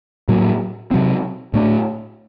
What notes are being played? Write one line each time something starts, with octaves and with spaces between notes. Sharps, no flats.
A2 F#3 A#3
C3 F#3 C4
A2 A3 D4